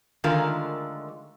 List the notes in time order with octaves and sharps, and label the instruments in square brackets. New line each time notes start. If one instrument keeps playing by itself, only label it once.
[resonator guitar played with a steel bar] D3 D#3 G#3 A3 F4 A#4